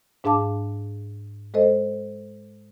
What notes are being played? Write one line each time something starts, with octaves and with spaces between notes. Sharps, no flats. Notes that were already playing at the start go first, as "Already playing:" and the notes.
G#2 D4 G#4 F5 A5 D6
G#3 A4 C5 D#5